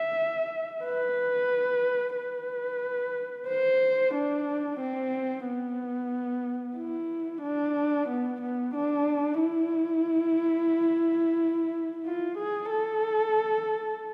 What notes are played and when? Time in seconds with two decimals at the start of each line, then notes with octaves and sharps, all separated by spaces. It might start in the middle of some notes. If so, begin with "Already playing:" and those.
Already playing: E5
0.85 B4
2.16 B4
3.47 C5
4.14 D4
4.79 C4
5.46 B3
6.77 E4
7.43 D4
8.09 B3
8.42 B3
8.75 D4
9.41 E4
12.05 F4
12.38 G#4
12.71 A4